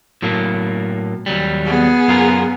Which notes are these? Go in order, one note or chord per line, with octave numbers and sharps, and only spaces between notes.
A2 F#3 A#3
D#2 F#3 G3
B3 G#4
F#2 F4 A#4